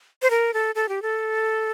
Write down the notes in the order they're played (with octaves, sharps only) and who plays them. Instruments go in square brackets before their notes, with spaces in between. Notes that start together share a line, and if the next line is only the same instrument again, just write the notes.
[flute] C5
A#4
A4
A4
G4
A4